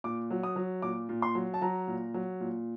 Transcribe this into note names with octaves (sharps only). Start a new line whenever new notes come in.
A#2 D6
F#3
D#6
F#3
A#2 D6
A#2
C6
F#3
A5
F#3 A#5
A#2
F#3
A#2